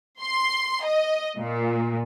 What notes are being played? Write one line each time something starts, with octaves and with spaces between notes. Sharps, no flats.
C6
D#5
A#2